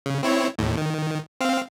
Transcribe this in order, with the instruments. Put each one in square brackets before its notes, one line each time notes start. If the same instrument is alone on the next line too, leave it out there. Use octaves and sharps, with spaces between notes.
[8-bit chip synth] C#3
C4 E4 C#5
D#2 A2
D#3
C4 F5